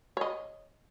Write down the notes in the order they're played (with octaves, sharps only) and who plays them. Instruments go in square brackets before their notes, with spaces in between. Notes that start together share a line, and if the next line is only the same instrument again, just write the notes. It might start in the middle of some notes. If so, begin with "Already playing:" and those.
[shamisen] C#5 D#5